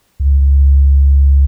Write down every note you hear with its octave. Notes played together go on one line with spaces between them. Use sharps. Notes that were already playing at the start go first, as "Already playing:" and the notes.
C#2